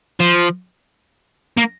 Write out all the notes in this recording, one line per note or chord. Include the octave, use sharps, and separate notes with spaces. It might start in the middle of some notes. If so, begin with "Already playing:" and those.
F3
A#3